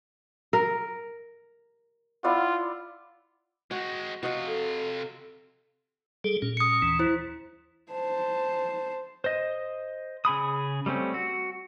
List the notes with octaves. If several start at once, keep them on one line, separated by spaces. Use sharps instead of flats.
A#4
E4 F4 D5 F#5
G#3 C4 F#4
C3 F4 F#4 D#5 F5
A4
G3 G#4 A4
A#2 C#4
D#6 C#7
D#2 E3
E4 C5
C5 A5
C5 D#5
C#3 G#4 B5 D#6
G3 A3 C4 C#4
F#4